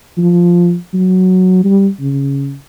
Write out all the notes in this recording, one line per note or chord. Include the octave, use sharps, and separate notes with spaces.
F3
F#3
G3
C#3